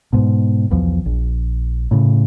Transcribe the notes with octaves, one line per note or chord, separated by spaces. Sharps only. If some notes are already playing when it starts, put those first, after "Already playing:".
G#2 B2
B1 E2 F3
A#1
A2 C#3